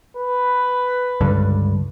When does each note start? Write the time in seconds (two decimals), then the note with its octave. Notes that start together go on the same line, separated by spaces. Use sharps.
0.17 B4
1.21 C#2 G2 D3